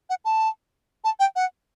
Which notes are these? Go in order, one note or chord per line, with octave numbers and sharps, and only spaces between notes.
F#5
A5
A5
G5
F#5